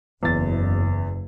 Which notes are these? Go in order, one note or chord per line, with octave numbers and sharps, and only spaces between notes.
F#1 E2 A6